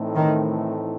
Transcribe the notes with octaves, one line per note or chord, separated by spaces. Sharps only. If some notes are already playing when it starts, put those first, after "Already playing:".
Already playing: A2 E3 A3 C4 D#4
D#3